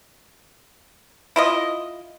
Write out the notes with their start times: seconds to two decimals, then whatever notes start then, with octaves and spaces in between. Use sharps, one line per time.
1.36 E4 F4 D#5